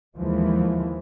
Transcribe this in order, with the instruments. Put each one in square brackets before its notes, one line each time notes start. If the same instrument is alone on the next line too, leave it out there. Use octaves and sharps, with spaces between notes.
[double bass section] D#2 E3 F3 G#3